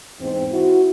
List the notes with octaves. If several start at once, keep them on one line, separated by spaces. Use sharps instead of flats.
E2 G#2 C4
E4 F#4